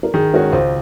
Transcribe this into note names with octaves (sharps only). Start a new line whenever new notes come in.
A#4
D#3 G#4
G#3 C#4 F#4 A#4
C#2 C5